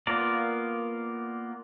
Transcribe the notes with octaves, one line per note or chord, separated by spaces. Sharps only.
A#3 B3 F4 A#4 D5